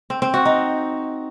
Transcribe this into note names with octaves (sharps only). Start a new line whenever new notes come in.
C4
C4
F#4
D#4